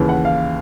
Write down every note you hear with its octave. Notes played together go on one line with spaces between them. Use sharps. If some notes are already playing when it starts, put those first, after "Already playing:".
Already playing: D#2 C#3 E3
F#5
F5